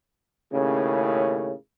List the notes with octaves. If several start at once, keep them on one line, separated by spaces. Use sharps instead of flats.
D#2 A2 C#3